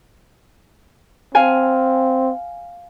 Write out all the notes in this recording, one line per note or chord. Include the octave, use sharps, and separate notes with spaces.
C4 F5 G#5